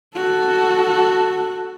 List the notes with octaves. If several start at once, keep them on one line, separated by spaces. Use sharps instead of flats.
F#4 A4